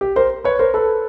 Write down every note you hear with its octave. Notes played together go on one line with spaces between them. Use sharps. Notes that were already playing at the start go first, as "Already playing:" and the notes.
G4
A#4 C5
B4 C#5
A#4 C5
A4 B4